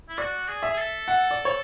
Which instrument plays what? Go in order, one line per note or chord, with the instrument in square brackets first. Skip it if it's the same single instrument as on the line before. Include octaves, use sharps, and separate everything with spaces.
[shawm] E4
[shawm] F#4 [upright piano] D5
[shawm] G#4
[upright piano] E5
[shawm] G#4
A4
[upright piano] F#5
D5
C#5